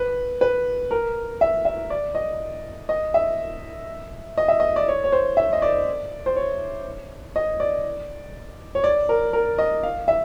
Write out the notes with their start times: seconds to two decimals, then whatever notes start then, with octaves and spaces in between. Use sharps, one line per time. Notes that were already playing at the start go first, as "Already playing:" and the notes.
Already playing: B4
0.41 B4
0.91 A#4
1.41 E5
1.65 E5
1.90 D5
2.15 D#5
2.89 D#5
3.14 E5
4.38 D#5
4.48 E5
4.60 D#5
4.76 D5
4.88 C#5
5.04 C#5
5.12 C5
5.37 E5
5.53 D#5
5.62 D5
6.26 C5
6.36 C#5
7.36 D#5
7.60 D5
8.75 C#5
8.84 D5
9.09 A#4
9.33 A#4
9.58 D#5
9.83 F5
10.08 E5